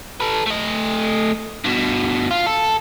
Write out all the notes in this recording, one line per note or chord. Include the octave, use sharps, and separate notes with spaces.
A4 B4
A3 D#5
G2 B2
F4
A4